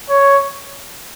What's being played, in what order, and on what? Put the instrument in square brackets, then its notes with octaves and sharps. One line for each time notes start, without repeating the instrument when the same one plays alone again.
[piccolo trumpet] C#5